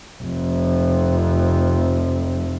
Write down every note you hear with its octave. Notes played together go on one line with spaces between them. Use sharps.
F1 F2